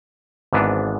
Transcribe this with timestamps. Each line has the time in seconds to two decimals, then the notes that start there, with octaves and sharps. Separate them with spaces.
0.53 G#1 G#2 E3 B3 D4